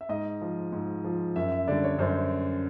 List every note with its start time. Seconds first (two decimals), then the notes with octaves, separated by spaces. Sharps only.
0.01 E5
0.09 G#2 D#5
0.41 F3
0.72 G#2
1.04 F3
1.36 F#2 E5
1.52 E5
1.68 D3 G3 D5
1.84 C#5
1.99 F#2 C5